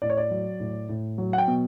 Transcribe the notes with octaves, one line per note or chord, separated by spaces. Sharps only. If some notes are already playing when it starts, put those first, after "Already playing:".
A2 D5
C#5
D5
F#3
A2
A2
F#3
F#5
G5
B2